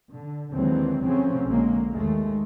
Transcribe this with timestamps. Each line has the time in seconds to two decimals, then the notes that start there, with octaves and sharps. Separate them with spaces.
0.11 D3
0.51 D#2 D3 E3 F#3 G#3 C4
1.03 C#3 F3 F#3 A3 C4 C#4
1.44 A#1 D3 F#3 G#3 A#3
1.91 D#2 G#3 A3